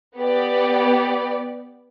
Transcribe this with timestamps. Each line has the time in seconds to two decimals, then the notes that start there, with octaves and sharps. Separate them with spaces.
0.18 B3 G4 D5